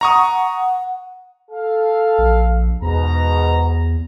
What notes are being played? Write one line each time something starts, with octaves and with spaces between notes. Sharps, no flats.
F#5 A#5 C#6 D#6
A4 F5
A#1
E2 G#2 B2 A#5